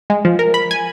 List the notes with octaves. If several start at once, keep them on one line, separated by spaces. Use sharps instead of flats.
G#3
F3
A#4
B5
G#5